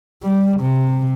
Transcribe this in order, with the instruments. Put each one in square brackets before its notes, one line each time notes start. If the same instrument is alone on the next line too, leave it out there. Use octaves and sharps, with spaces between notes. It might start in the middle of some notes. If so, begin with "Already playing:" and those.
[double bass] G3
C3